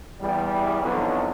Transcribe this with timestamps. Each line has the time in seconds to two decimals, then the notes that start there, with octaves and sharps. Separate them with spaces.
0.21 E2 G3
0.81 B1 F2 B2 D3 E3 F#3